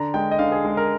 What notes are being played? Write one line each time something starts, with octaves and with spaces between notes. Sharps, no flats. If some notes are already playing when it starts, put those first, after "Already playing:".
Already playing: D3 A#5
G#3 G5
D#5
D3 F5
G#4
G#3
A#4